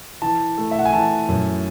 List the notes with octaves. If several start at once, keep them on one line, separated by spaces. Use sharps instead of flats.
E3 A5
A3
E5
F#5
G#5
E3 A5
F#2